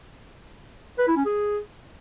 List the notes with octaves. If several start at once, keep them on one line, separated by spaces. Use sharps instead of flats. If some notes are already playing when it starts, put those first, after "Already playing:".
B4
E4
C#4
G#4